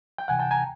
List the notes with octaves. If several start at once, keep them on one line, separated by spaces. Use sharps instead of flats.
G5
D2 C3 E3 F#5 G#5
G5 A5
G#5 A#5